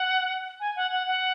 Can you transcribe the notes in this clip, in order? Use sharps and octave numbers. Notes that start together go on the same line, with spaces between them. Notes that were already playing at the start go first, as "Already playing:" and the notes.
Already playing: F#5
G#5
F#5
F#5
F#5